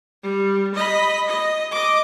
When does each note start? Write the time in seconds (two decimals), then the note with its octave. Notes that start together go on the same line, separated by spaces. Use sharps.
0.23 G3
0.75 D#5 B5
1.27 D#5
1.71 D#5 D6